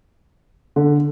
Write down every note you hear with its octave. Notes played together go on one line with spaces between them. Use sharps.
D3